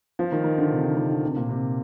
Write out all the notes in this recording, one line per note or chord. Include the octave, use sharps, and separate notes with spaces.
F3
D#3
D#3
D3
C3
D3
D#3
D3
C3
A#2
C3